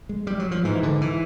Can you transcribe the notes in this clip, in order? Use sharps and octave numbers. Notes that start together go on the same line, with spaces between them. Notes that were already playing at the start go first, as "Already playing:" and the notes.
G#3
G3
F#3
F3
G#2 E3
D3
E3